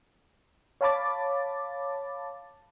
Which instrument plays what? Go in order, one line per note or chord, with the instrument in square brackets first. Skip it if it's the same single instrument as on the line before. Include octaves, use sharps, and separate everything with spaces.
[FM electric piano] C#5 F5 A5 B5 D6 A6